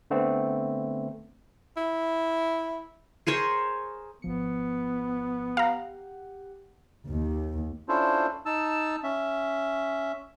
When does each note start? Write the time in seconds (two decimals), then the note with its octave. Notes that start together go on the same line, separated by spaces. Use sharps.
0.10 D3 A3 B3 C4
1.77 E4
3.27 G#4 A#4 C5 C#5
4.22 G#1 F3 B3 C#7
5.57 G4 F5 F#5 A#5
7.07 D#2
7.89 C#4 D4 E4 F4 A4 C5
8.46 D#4 A5 E6
9.04 C#4 E5